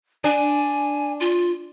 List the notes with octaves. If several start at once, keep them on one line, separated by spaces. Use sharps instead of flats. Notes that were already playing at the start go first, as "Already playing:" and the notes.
D4 G#5
F4